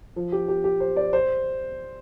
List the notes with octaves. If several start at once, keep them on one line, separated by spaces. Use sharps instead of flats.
F3
G4
G4
G4
C5
D5
C5